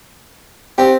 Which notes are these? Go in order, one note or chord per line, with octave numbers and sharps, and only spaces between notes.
C4 G4